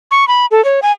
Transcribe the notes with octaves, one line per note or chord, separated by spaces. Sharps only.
C#6
B5
A4
C#5
G#5